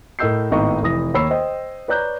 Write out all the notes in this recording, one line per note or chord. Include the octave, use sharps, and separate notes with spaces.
A2 A#4 D#5 E6 G6 C7
G#1 A2 B3 D#4 D#5 C#6
F1 E3 B4 D#6 A#6
D#2 C#5 B5 E6 C7
C5 D#5 G5
B4 C#5 D5 A#5 F#6 G6